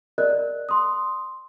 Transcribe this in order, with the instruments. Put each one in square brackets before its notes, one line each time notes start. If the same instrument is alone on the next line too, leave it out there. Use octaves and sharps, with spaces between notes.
[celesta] A#4 D5 D#5 F#6
C6 D#6